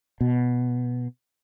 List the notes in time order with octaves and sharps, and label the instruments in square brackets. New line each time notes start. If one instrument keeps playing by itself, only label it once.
[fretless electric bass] B2